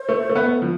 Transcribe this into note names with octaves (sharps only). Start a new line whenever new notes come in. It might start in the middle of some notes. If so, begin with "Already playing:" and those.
Already playing: C5
A3
A3
B3
F3